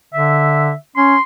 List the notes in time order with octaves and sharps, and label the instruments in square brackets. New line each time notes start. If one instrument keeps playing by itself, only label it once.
[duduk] D3 [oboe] E5
[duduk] C#4 [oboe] C6